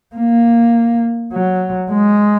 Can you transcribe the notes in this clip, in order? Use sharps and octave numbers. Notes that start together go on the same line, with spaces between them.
A#3
F#3
G#3